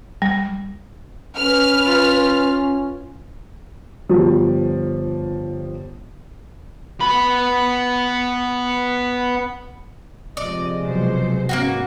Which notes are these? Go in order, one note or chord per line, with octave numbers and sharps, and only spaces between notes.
G3
C#4 B4 F6
F4
G1 F3 G3
B3 B5
C3 F3 G#3 D5 D#5
B2 F#3 C5
G#2 A#3 B3 C#4 F4 F#4